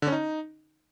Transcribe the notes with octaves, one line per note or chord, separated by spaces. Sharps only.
D3
C#4
D#4